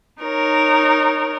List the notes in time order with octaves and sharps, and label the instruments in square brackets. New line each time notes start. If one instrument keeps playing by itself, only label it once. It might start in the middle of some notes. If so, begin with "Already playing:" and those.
[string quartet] D#4 A#4 C#5